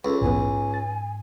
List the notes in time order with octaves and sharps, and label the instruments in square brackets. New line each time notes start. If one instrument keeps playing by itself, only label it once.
[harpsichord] C#2 [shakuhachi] A4
[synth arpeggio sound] A#1 E2 B3 [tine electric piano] G#2 [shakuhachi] G#5
[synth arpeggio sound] A6